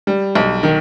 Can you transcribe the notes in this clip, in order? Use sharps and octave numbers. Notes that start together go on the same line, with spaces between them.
G3
B1
D#3